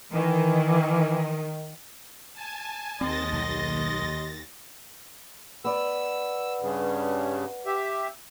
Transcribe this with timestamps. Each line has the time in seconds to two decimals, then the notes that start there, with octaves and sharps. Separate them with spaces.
0.12 D#3 E3
2.33 G#5 A5
3.01 D#2 C4 D#5 C6 D#6 A6 A#6
3.33 B1
5.64 B3 D5 E6
6.61 G2 C#3
7.66 G4 E5